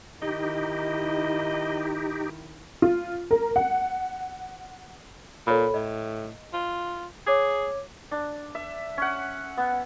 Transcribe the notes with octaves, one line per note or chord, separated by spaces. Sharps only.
D#3 D#4 E4 G4 D#5
F4
A#4
F#5
A#2 A4 C#5 B5
A2 D#5
F4
G#4 C#5 D6 G#6
D4
E5
C#4 F#5
B3